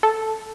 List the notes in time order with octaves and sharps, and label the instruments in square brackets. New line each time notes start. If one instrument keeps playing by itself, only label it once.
[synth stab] A4